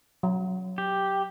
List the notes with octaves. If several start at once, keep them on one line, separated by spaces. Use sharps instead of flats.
F#3
G4